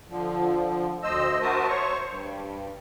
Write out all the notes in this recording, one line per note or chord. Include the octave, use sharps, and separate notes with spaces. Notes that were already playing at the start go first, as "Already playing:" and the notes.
D3 F3
D2 C5 D#5 E6
F#4 A#4 C5 E5 A5 D#6
C5 C#5 C#6
G2